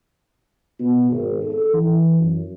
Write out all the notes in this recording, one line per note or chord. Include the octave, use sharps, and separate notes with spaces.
B2
G#1
A4
E3
F#2